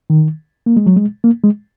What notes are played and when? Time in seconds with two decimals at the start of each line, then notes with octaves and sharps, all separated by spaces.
0.10 D#3
0.66 A#3
0.77 G#3
0.86 F#3
0.96 G#3
1.24 A#3
1.43 G#3